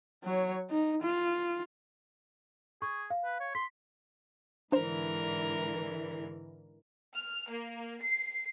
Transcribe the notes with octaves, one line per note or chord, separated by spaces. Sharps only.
F#3 C#5
D#4
F4
G#4 C#6
F5
B4
C#5
C6 B6
G#2 D3 E3 D4 A#4 C5
F6
A#3
C7